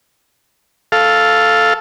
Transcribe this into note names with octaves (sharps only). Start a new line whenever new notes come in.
A4 F5